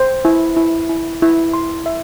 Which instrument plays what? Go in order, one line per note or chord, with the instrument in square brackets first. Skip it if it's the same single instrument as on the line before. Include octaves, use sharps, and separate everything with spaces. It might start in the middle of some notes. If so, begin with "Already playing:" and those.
Already playing: [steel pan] C5
E4
E4
E4
E4
C6
E5